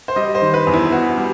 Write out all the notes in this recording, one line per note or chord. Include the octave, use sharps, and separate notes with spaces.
C5
G3 D#5
C5
D#3
B4
E2
E4
B3 F#4
G3